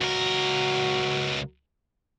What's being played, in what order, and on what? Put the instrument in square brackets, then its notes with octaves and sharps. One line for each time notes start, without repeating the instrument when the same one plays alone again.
[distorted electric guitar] C#2 A#4 [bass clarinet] F#4